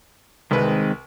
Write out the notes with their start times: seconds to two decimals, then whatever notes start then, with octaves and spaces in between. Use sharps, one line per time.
0.51 C2 D#3 G#3 C4 B4